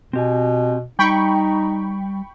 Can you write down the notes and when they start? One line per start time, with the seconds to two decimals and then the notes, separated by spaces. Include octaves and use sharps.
0.13 B2 C4 G4 G#5
0.99 G3 D#4 G5 B5 C#6